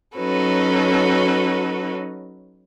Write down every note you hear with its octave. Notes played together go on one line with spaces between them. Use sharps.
F#3 C#4 D#4 F#4 A4 B4